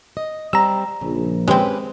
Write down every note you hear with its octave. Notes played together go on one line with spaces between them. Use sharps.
D#5
G3 C4 A#5 E6
A#1 C#3
G#3 C4 C#4 G4 B4